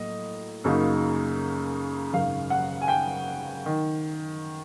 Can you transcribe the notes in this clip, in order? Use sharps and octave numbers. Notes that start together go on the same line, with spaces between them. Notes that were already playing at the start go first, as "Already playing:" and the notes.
Already playing: A2 F#3 A#3 D#5
F#2 C#3 F#3 A#3 D#4
G#1 F#2 C#3 F5
F#5
G#5
G5
D#3